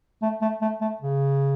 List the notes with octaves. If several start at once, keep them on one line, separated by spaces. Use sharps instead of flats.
A3
A3
A3
A3
C#3